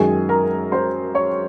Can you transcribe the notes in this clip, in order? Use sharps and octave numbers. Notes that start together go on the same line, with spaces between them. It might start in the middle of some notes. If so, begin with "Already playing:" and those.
Already playing: F#2 D#3 G#3 G#4 G#5
A#4 A#5
C5 C6
C#5 C#6